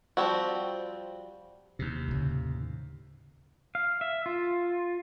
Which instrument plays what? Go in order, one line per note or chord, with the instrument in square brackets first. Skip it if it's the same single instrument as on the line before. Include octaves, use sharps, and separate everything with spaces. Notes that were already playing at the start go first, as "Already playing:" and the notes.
[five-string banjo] F3 G3 C4 F#4
[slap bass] D#2 C3
[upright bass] A2 C#3
[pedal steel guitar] F5
E5
F4